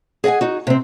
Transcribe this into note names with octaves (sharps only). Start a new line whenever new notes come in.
G#4 D#5 E5 F#5 G#5
D#4 F#4
C3 C4